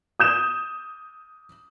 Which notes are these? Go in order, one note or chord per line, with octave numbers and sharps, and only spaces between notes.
D#6 G6 E7